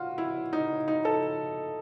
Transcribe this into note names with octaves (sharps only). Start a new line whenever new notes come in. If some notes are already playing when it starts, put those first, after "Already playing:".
Already playing: B2 F4 F#4
E4
D#4
D#4
A4